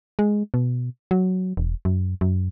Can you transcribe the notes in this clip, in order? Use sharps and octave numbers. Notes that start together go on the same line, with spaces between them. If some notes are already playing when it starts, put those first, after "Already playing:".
G#3
B2
F#3
E1
F#2
F#2